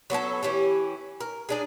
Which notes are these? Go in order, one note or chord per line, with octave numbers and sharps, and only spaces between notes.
F#3 B3 C#4 A4
E3 C#4 E4 G4
A#4
G#3 D4 G#4